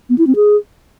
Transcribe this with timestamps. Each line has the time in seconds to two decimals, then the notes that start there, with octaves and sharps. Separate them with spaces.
0.10 B3
0.18 E4
0.27 C4
0.36 G#4